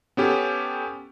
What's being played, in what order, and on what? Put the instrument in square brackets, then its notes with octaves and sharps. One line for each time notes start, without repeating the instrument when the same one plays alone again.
[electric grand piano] B3 C#4 G4 A4